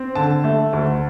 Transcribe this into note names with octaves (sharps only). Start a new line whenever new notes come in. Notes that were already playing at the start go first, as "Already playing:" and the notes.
Already playing: C4
D3 A5
A3
D2